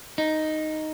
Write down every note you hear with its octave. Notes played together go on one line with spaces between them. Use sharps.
D#4